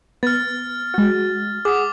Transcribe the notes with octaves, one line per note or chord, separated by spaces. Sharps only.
B3 F6 A6
G#3 F#4
G#4 F#5 D6 D#6